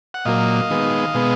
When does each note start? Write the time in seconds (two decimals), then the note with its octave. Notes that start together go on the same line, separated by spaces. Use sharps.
0.14 F#5
0.25 A#2 F#3 A#3 D#5 F5
0.70 D#3 G#3 B3
1.14 B2 G#3 B3